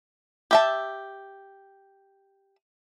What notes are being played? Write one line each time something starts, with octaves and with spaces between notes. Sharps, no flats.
G4 E5 A5